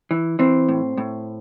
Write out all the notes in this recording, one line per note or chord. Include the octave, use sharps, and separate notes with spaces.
E3
E3 C4
A2
A2